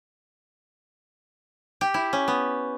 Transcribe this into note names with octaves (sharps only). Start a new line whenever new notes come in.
G4
E4
C#4
B3